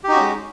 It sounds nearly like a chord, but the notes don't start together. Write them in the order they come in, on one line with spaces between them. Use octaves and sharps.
G4 D#4 F#4 C#4 G#3